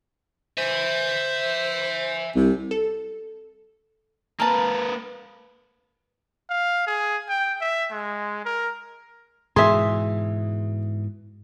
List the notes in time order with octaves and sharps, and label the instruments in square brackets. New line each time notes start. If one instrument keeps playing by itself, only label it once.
[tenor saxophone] C5 [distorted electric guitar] E5 G#5
[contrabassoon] C2 [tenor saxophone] C3
[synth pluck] A4
[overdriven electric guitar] A#3 B4 [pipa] A#4 A5
[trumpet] F5
G#4
G5
E5
G#3
A#4
[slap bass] G#2 B2 E3 [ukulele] G#4 E5 [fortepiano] C6